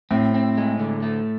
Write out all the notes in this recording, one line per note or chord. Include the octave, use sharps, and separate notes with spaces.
A2 C4
C4
G#3
D3
A3